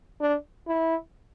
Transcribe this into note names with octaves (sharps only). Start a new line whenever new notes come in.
D4
E4